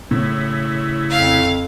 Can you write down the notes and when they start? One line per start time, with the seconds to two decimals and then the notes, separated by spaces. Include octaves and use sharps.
0.11 A2 C#3 E4
1.11 F2 F5